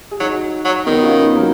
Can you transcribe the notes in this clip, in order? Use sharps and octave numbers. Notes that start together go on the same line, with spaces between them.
G#4
F#3 D#4 F#4
F#3
D#3 B3 D#4
C#4 F4
B3 D#4
F#3 A#3